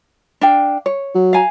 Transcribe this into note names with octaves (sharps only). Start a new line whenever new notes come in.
D4 F5 G5
C#5
F#3
F5 G#5 A#5